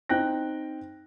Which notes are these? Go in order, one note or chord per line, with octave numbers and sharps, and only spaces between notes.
C4 D#4 G5 F#6 A#6